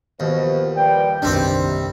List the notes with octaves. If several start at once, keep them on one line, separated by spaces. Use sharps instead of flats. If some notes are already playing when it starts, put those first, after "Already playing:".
D#2 B2 F3 B4 C5
F3 G3 B4 D5 G5
F#1 B1 C3 D#3 G3 C4 D4 D5